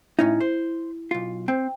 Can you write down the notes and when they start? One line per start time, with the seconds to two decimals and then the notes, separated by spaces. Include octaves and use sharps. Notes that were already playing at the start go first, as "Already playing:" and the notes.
0.19 A2 C#4 D#4 E4
0.40 C5
1.11 B1 F4
1.48 C4 G5